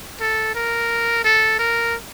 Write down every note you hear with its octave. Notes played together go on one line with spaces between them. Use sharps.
A4
A#4
A4
A#4